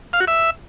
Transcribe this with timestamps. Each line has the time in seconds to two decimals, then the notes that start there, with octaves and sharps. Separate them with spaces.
0.13 F5
0.20 F#4
0.27 E5